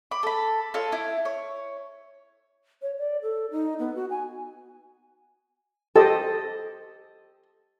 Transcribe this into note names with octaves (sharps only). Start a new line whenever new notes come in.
B5 D6
A4 B5
F4 A4 C#5
E4
C#5
C#5
D5
A4
D#4
B3
F#4
G#5
G4 A4 C5 D#5